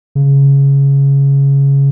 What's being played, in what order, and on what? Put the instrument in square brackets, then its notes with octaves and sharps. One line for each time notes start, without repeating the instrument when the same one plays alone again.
[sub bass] C#3